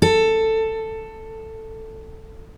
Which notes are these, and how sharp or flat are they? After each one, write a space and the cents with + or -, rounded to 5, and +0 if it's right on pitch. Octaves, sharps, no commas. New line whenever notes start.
A4 +10